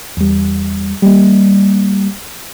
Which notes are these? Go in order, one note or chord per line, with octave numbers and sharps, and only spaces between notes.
E2 G3
G3 A#3